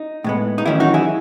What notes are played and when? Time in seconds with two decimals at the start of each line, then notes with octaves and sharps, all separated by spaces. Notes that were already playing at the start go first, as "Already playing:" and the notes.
Already playing: D#4
0.24 A2 G#3 B3
0.58 D#4
0.66 E2 D#3 F#3 C#4 E4
0.80 D#4 F#4
0.94 E4 G#4